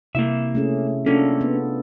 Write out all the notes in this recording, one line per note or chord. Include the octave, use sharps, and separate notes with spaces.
C3 A#3 E4 E5
A3 C#4 G#4
A#3 C#4 D4 F4 A4
B3